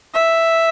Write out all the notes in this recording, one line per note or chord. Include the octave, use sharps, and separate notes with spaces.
E5